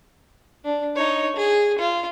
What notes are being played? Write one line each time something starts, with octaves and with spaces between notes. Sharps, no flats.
D4
D#4 C#5
G#4
F4